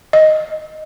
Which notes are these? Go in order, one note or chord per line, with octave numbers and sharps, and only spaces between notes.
D#5